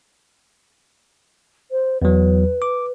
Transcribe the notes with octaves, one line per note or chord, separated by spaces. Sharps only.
C5
E2 F#3 B4
D6